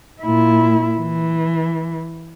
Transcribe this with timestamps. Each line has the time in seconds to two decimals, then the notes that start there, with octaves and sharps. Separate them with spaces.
0.22 A#2 E4
1.00 E3